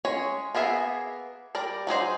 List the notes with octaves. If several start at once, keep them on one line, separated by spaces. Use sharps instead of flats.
G#3 C#4 C#5
A#3 B3 G#4 E5
G3 A#4 D5
F#3 D#4 G#4 C5